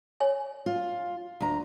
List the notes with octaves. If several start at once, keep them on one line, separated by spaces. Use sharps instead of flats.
C#5 G#5
F4
D2 A#5